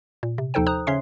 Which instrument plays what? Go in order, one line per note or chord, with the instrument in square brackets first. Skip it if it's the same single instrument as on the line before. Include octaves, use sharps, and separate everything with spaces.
[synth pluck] A#2
C3
D#2 F3 D#4 A4 C5 G5
C5 A#5 D#6 F#6
C#3 C#4 C#5 E5 C6 C7